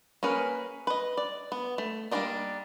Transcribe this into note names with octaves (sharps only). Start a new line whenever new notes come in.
A#3 C#4 G#4 B4
B4 D#5
D5
B3
A3
G3 A#3 C4 D4 D#4